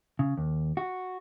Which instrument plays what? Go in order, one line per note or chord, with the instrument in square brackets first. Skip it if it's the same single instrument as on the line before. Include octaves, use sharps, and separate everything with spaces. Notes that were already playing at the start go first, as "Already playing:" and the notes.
[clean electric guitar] C#3
D#2
F#4